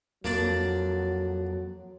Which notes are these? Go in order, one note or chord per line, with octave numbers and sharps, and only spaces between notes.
F2 F#3 A#3 D4 D5